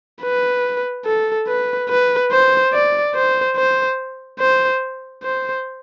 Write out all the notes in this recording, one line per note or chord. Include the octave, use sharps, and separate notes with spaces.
B4
A4
B4
B4
C5
D5
C5
C5
C5
C5